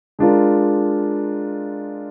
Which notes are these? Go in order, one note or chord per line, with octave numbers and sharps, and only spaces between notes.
G#3 D4 F4 A#4